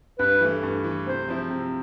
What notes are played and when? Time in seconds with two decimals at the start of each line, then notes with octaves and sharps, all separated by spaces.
0.19 G2 B4
0.40 E3 A3
0.63 G2
0.84 E3 A3
1.06 C3 C5
1.28 F3 C4 E4
1.50 C3